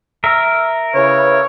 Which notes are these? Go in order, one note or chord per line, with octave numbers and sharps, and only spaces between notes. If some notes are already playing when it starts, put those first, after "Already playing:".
A#4 E5
C#3 E4 B4 C#5